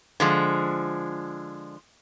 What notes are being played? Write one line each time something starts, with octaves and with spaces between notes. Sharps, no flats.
D3 F3 G#3